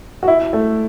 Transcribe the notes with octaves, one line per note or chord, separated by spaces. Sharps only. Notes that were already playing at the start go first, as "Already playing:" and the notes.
F#4
E4
A3